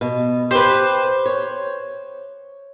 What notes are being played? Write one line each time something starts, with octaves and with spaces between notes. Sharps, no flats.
B2
G4 B4 C5
C#5